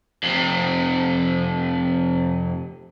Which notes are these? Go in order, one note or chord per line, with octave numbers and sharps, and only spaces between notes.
F2 C3